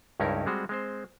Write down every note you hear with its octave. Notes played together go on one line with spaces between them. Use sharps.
C#2 G2 C#4 D#4 E4 A#4
G3 G#3 C4 F#4
G#3 C4 C5